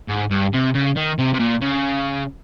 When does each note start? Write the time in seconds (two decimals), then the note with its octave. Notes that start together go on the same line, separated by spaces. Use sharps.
0.09 G#2
0.31 G2
0.53 C3
0.74 C#3
0.96 D#3
1.19 C3
1.34 C3
1.40 A#2
1.62 C#3